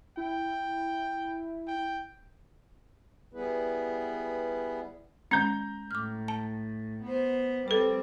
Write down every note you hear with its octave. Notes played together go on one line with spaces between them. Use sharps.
E4 G5
G5
G3 B3 E4 G#4 B4
G#3 C#4 A#5 G6
A2 D6 F6
A5
B3 C5
G3 C4 A4 B4